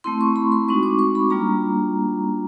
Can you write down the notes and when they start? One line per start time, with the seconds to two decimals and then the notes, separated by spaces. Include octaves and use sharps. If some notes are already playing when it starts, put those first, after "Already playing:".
0.04 A3 C4 E4 C6
0.21 C#6
0.36 B5
0.52 C6
0.68 G#3 C4 D#4 F#4 C#6
0.83 D6
0.99 C#6
1.15 B5
1.30 G3 A#3 D4 F4 A#5